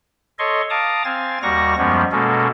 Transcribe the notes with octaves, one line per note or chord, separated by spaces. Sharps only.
A4 C#5 D#5 C6 C#6
F5 A5 A#5 D6 D#6
C4 F5 G#5 A6
D#2 G3 F#4 A#5 C#6 A#6
F#2 F3 G3 G#3 B3 C#4
B2 G#3 A#3 C#4 A4